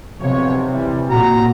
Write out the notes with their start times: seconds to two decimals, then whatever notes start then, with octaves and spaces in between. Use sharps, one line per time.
0.21 B1 C3 F3 C#5
0.72 E3 G3
1.09 A#2 F#4 A#5